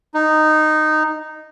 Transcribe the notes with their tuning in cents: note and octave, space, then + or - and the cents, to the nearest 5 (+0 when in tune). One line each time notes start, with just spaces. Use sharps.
D#4 -10